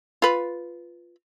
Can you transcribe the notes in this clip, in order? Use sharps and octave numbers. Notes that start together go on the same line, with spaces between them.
F4 B4